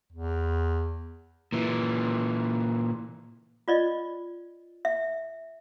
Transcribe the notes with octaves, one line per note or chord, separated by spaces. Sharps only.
E2
A#2 E3
F4 D5 D#5
E5